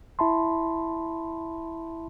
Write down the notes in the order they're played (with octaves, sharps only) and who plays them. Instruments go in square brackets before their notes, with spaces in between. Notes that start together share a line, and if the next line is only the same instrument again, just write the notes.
[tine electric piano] E4 E5 A5 B5 C6